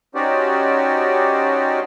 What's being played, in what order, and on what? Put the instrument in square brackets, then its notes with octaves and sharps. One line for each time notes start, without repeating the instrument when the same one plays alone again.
[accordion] C#4 D#4 F#4 G4 C5 D5